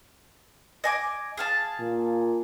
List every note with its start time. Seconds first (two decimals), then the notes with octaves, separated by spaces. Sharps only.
0.84 D#5 G#5 D6
1.37 G#4 F5 A5
1.80 A#2